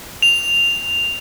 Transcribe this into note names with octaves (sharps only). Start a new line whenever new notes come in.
F7